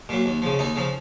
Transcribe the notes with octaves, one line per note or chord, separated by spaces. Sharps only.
A#2 F#3
D#2
C#3 F3
D#2 D#4
C#3 F3